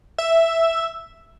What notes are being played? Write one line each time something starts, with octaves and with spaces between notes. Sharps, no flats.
E5